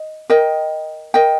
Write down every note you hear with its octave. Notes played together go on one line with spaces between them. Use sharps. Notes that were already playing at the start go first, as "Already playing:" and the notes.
Already playing: D#5
A#4 D#5 G5
A#4 D#5 G5